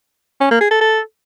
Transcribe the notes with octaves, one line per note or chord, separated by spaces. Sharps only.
C#4
A#3
G#4
A4
A4